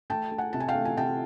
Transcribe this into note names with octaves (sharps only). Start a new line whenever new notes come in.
A3 G5 A5
A3
F#5 G#5
C3 A5
G#5
F5 G5
A3
G#5
C3 G5 A5